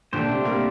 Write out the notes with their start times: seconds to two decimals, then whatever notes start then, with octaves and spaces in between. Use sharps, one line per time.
0.13 A#2 D3 A3 D4 G4 C5
0.29 C3
0.45 G3 A#3